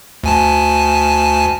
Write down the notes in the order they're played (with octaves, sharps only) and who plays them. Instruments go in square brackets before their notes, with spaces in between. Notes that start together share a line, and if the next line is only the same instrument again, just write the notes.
[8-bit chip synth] D2 G#5 A5